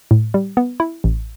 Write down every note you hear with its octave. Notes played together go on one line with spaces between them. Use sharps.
A2
G3
B3
E4
A1